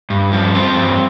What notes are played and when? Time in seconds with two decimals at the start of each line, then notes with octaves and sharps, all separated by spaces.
0.10 G2
0.32 F3
0.54 C4
0.77 G2